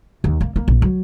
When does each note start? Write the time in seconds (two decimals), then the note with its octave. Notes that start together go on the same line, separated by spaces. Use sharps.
0.24 D#2
0.41 A#3
0.56 A#3
0.68 A#1
0.82 F#3